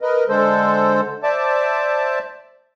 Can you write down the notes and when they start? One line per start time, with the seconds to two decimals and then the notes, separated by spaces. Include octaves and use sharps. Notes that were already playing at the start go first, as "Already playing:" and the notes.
0.01 A#4 B4 D#5
0.29 D3 G#3 A4 C5
1.23 C5 D5 E5 A5 D6